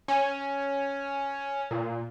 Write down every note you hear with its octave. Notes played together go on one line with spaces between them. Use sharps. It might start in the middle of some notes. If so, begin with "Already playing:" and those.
C#4
A#2